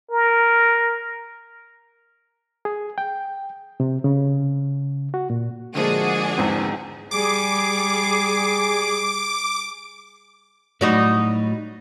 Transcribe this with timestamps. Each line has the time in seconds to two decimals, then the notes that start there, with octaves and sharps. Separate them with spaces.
0.11 A#4
2.65 G#4
2.98 G5
3.80 C3
4.04 C#3
5.14 F#4
5.30 A#2
5.75 D3 F3 G#3 A#3 D4 F#4 G#4
6.38 E2 G#2 C4
7.11 G3 G#4 D6
10.81 A2 F#3 G3 D#4 F#4 D5